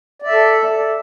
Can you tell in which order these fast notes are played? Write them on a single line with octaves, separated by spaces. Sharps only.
D5 E5 A4